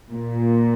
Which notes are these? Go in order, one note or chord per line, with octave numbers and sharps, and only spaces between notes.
A#2